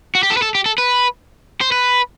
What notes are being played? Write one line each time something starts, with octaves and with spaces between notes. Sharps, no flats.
F#4
G4
A4
B4
A4
G4
A4
B4
C5
B4